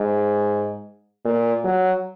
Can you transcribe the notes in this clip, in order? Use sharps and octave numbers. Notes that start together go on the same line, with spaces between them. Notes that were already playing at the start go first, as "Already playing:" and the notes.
Already playing: G#2
A#2
F#3